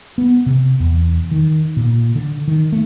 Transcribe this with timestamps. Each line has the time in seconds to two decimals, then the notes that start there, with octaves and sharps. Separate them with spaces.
0.18 B3
0.46 C3
0.80 E2
1.31 D#3
1.77 A#2
2.15 D3
2.48 D#3
2.72 A3